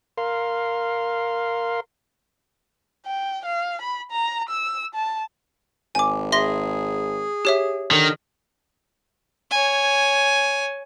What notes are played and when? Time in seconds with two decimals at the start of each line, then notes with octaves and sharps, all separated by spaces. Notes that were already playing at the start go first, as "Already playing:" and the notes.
0.18 A#4 F5 C6
3.06 G5
3.45 F5
3.82 B5
4.11 A#5
4.49 E6
4.95 A5
5.95 G#1 G#5 D6
6.32 G#4 E5 C6 A#6
7.45 G4 C#5 E5
7.91 D3 D#3
9.51 C#5 G#5